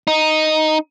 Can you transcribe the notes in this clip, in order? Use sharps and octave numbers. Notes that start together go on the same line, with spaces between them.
D#4